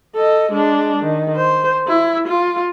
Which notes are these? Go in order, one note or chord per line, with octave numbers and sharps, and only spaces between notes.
A4 D#5
G#3 D4
D#3
C5
E4
F4